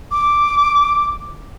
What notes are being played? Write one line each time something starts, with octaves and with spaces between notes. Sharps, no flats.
D6